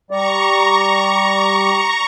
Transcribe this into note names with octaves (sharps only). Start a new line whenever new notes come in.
G3 D5 A#5 C#6